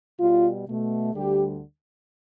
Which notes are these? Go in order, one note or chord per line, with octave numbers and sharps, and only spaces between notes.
B2 G3 F4
B2 A3
D2 D3 G3 G4